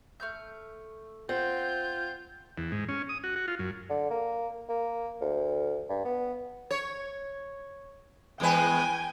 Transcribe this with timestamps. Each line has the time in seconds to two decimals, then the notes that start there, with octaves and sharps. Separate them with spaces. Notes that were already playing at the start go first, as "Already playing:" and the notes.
0.20 A3 F6 G6
1.29 C4 F4 F#5 G6
2.58 E2
2.72 G#2
2.89 C#4
3.09 D#6
3.24 F#4
3.36 F#4
3.48 F4
3.59 F#2
3.90 D3
4.10 A#3
4.69 A#3
5.21 D2
5.89 G2
6.05 B3
6.71 C#5
8.40 E2 G#3 B4 G5 G#5